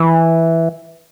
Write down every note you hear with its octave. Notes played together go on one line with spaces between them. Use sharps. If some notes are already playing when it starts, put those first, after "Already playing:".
Already playing: E3